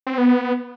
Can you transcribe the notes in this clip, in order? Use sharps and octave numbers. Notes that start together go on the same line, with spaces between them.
C4
B3